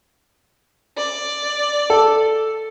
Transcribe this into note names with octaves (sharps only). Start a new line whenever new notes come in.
D5
A4